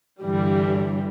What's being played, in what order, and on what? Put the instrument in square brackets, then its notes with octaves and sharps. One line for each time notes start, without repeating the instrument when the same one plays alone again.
[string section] G2 D3 E3 G3